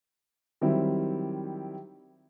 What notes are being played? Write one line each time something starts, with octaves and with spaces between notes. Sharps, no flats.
D#3 F#3 G3 C4 E4